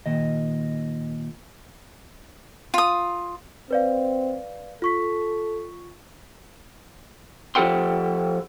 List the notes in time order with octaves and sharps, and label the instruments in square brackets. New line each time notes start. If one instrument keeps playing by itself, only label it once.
[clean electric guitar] A#2 D#3 D#5
[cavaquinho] F4 D#6
[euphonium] C4 [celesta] B4 D5 F5
[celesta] F4 C#6 B6 [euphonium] A4
[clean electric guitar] F3 G4 A4 F#5 G5 C6